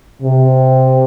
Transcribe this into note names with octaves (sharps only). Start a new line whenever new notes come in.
C3